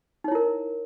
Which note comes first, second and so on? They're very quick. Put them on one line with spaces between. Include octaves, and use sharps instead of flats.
D#4 C#5 E4 A#4